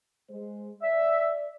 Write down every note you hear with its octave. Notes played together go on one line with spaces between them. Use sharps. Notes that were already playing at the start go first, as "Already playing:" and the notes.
G#3 C5
D5 E5